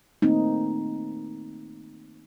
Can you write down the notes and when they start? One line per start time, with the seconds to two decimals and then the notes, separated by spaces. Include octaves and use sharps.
0.22 D#3 A3 A#3 C4 D#4